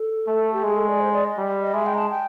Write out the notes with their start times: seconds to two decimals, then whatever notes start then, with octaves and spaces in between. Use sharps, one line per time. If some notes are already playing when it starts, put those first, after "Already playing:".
Already playing: A4
0.27 A3
0.53 G4
0.64 G#3 G#4
0.76 A4
0.88 D5
1.00 C5
1.12 D5
1.24 D#5
1.37 G3
1.61 D#5
1.74 G#3 E5
1.86 G5
1.94 A#5
1.98 A5
2.10 G5